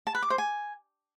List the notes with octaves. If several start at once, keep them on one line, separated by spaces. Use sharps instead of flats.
A5
B4
D6
C5
G#5